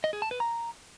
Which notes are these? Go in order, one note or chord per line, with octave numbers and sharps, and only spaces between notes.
D#5
G#4
A5
B4
A#5